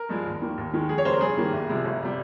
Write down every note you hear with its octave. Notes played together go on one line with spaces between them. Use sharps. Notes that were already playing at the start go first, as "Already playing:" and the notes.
Already playing: A#4
G2 F3 G#3
D#2
D#3 A#3
D#2
D#3 G#3
F2 G#4
C#5
C#3 G3 A#3 C5
A#4
G2 G#4
D#3 G3 A#3
C2
C3 F3 G#3
G1
C3 G3